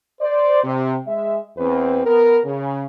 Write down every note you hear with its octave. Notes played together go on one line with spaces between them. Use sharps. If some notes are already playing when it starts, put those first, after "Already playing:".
C5 D5
C3
G#3 E5
E2 C4 B4
B3 A#4
C#3